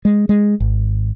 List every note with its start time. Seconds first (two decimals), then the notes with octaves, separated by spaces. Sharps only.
0.05 G#3
0.29 G#3
0.60 G#1